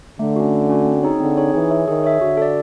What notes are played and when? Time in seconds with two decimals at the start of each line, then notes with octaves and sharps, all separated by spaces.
0.19 D3 A3
0.36 C#4 F#4
0.53 A3
0.69 C#4 F#4
0.86 C4
1.03 D#4 G#4 C#5
1.20 D3 C4
1.37 D#4 G#4 C#5
1.54 E3 G#4
1.70 C#5 E5
1.88 D#3 G#4
2.04 C#5 E5
2.21 D3 F#4
2.37 A4 D5